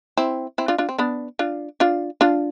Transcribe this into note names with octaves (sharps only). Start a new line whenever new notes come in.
C4 E4
C4 E4
D4 F4
D4 F4
C4
B3 D4
D4 F4
D4 F4
D4 F4